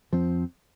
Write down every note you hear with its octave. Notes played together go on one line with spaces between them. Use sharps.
F2 F3 C4